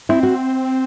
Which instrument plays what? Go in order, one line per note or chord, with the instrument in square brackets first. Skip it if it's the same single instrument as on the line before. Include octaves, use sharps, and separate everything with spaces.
[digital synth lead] C4 [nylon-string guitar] E4
[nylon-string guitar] F#4